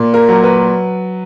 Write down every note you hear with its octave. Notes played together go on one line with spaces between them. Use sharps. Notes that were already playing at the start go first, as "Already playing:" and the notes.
Already playing: A#2
A#4
F#3
B4